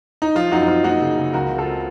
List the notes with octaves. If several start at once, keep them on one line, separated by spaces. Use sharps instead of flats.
D#4
F3 F4
F#2 D#4 F#4
D#4
C4 F4
A#3 D#4 F#4
C#3
C#3
C#2 F#4 A#4
C#2
F4 A4
C4